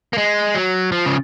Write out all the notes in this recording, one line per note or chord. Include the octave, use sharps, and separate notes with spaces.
A#3
G#3
F#3
F3
C#3